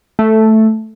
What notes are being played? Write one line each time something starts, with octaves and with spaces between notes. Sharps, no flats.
A3